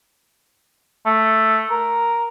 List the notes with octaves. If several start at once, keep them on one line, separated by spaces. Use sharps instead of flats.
A3
A#4